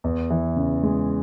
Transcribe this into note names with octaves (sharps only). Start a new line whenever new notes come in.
E2
E3
C#3
G#3